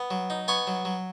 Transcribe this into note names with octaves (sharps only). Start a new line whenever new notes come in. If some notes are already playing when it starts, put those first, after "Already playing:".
Already playing: B3
F#3
D#4
B3 G#5 C#6
F#3
F#3